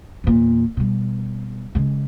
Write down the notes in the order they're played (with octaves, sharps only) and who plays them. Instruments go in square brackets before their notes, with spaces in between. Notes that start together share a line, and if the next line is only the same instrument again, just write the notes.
[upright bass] E2 A#2
B2 G3
C#3 G#3